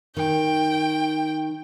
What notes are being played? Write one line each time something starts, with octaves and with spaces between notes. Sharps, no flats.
D#3 G5